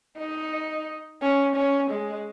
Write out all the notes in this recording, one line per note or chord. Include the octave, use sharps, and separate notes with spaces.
D#4
C#4
C#4
G#3